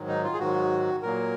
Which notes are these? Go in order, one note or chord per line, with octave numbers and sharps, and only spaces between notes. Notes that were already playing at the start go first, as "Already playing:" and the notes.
Already playing: G#2 D#3 F#3
D#4
F4
G#4
G#2 D#3 F#3 F#4
A#2 F#3 A#3 A#4